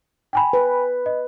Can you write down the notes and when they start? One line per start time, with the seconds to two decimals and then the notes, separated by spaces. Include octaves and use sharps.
0.33 G5 G#5 B5
0.53 B4
1.06 D#5